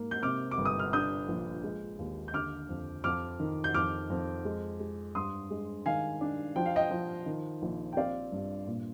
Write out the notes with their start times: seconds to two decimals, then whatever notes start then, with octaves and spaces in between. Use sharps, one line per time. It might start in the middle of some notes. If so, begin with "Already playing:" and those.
Already playing: G#2 A#3
0.11 G6
0.23 C3 D6 F6
0.51 D6
0.58 G1
0.65 D#6
0.79 F6
0.93 D4 D#6 G6
1.28 A#1
1.64 G#3
1.99 D#2
2.28 G6
2.34 D3 D6 F6
2.69 F2
3.04 F2 D6 F6
3.40 D#3
3.64 G6
3.74 F2 D6 F6
4.10 F2
4.45 G#3
4.80 G#3
5.15 G2 C6 D#6
5.51 G#3
5.86 D#3 F5 G#5
6.21 D4
6.56 F3 G5
6.66 F5
6.76 D#5 G5
6.91 F3
7.26 D#3
7.62 A#1
7.93 G5
7.96 C4 D5 F5
8.32 G2
8.67 A#2